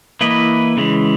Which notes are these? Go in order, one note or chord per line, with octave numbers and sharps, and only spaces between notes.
E3 A#3 E4 B4 D#5
C#3 E3 G#3